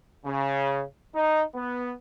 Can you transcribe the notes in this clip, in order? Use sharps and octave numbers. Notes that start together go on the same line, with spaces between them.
C#3
D#4
B3